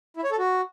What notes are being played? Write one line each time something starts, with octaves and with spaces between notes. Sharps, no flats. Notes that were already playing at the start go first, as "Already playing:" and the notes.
E4
C#5
A4
F#4